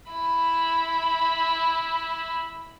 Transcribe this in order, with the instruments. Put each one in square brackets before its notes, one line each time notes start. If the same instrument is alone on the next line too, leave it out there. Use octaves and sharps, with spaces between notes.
[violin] E4 B5